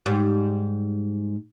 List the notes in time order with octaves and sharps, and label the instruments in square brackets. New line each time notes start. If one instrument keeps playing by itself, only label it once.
[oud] G#2 G3